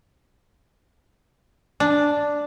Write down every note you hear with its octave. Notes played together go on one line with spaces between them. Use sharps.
D4